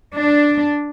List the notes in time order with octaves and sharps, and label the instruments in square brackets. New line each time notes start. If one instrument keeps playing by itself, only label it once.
[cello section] D4